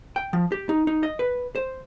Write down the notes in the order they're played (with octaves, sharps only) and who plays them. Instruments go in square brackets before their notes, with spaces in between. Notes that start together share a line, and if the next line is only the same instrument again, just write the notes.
[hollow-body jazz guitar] G5
F3
G4
D#4
D#4
D#5
B4
C5